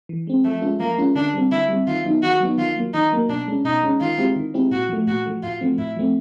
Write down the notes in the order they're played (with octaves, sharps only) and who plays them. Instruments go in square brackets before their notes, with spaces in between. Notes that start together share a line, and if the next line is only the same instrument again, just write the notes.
[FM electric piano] E3
G#3 C4
[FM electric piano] F3 [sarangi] A3
[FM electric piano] G#3 C#4 F4
[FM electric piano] F3 [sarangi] A#3
[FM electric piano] G#3 C#4 F4
[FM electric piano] D3 [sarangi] D4
[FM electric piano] G3 C4
[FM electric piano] D3 [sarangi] E4
[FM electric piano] G3 C4
[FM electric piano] D#3 [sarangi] F4
[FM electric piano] F#3 B3 D#4
[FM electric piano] D#3 [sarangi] F#4
[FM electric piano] F#3 B3 D#4
[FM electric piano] D#3 [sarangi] F4
[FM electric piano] F#3 A#3
[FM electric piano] D#3 [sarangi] D#4
[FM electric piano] F#3 A#3
[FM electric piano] B2 [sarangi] D4
[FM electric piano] G#3 C#4
[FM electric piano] B2 [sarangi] D#4
[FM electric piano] G#3 C#4
[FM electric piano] D#3 [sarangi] F4
[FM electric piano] G#3 C4 E4 G4
D#3
G#3 C4 E4 G4
[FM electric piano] A#2 [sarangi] F#4
[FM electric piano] F3 A3
[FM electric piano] A#2 [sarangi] F#4
[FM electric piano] F3 A3
[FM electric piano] A2 [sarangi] F4
[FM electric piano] F3 A3 C4
[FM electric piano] A2 [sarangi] E4
[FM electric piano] F3 A3 C4